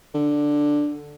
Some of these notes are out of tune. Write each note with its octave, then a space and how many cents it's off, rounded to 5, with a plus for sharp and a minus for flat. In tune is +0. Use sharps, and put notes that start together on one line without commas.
D3 +5